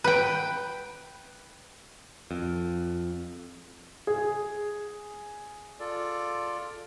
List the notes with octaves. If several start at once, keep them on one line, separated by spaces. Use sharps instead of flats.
B4 G5
F2
G#4
F4 A4 D5